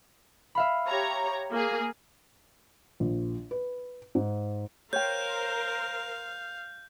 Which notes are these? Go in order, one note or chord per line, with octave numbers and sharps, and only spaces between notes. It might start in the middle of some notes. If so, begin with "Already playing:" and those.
E5 F5 B5
G4 C#5 A#5
A#3 G#4
A#1
B4
G#2
A#4 C5 C#5 F5 G5 G6